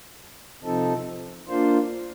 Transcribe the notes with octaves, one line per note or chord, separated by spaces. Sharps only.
C3 F3 C4 D#4 A4
A#3 D4 F4 C5